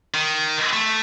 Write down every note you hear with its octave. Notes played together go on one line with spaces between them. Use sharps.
D#3
A3